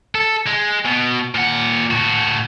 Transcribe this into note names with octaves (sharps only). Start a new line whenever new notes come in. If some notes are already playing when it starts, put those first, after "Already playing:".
A4
G#3
B2
A#2 F#5
A2 F#4